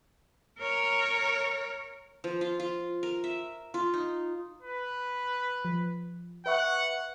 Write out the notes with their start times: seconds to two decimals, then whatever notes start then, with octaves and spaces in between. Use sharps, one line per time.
0.59 A#4 C#5
2.24 F3
2.41 F4
2.60 F4
3.03 A#4
3.24 E5
3.74 F4
3.94 D#4
4.62 B4
5.65 F3
6.46 B4 E5 F#5 C#6